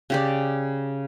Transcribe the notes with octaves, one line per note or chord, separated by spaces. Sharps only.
C#3 G4 D5